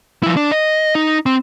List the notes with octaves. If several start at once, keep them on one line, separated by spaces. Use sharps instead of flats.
F3 E4
D4
D#5
D#4
C4